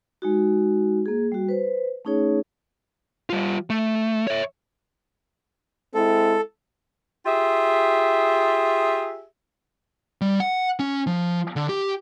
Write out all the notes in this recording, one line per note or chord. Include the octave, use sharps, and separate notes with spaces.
G#3 D#4 F#4
A#3 G#4
G3 F#4
B4 C5
A3 C#4 D#4 G#4 C#5
G3 F4
A3
C#5 E5
G#3 C4 E4 A4
F4 G4 G#4 E5
G3
F#5
C#4
F3
D3
G4